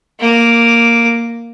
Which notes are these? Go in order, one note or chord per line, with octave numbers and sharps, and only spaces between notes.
A#3 D6